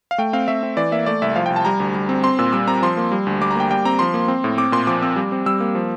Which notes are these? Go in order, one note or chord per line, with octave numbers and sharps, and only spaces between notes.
F5
A3 G5
C4 F5
A3 E5
C4
E3 D5
A#3 E5
A3 D5
C2 E5
F3 F5
G5
C2
A5
G3 A#5
D2
G3
C4
C4 C6
A#2 E6
G3 E6
C4 A#5
F3 C6
A#3
G3
D2
G3 D6
A#5
A#3 G5
G3 G5
C4 A#5
F3 C6
A#3
C4
A2
C4 D6
A#2 C6
F3 D6
C4 E6
G3
C4
G3 E6
A#3
F3